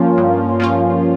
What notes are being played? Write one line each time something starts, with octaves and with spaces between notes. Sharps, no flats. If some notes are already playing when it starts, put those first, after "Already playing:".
Already playing: G2 F3 A#3 C#4 F4
G2
F3 A#3 C#4 F4